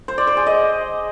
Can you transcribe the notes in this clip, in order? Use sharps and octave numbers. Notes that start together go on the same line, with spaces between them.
C5
D5
C5
G#4
D#5